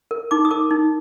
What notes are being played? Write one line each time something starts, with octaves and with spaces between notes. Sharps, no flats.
A#4
D#4 D6
D#6
A#4 D6
D#4